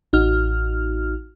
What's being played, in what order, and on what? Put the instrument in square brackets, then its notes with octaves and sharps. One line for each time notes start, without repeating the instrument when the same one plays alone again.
[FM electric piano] A1 D#4 F#4 F6